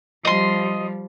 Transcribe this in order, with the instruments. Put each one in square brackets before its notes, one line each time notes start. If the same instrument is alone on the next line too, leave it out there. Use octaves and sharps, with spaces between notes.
[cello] F3 G3 [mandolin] D#5 C6